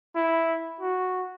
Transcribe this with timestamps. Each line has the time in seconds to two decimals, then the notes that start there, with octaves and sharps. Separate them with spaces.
0.15 E4
0.81 F#4